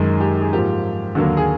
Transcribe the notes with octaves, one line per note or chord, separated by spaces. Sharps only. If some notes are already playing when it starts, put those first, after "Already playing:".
Already playing: F#2 D#3 G#3
G4
G#4
G#2 F3 A#3 G4
D#2 D3 F#3 A#3 F#4
G#4